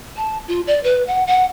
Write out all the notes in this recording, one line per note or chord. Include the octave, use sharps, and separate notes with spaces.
A5
F4
D5
B4
F#5
F#5